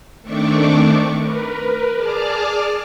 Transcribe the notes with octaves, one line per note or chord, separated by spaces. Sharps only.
D#3 A3 C4 D4 C#6 D6
A#4 B4
G#4 D5 A5 D6 F6